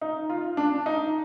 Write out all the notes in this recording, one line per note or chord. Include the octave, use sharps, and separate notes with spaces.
D#4
F4
D4
D#4